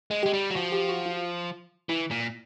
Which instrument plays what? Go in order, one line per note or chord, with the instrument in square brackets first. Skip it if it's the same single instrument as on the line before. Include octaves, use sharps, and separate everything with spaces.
[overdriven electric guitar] G#3
[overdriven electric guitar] G#3 [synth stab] G4
[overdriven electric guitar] G3
F#3
[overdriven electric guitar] F3 [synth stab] F#4
[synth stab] G4
F#4
F4
[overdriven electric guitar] E3 [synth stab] E4
[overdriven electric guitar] A#2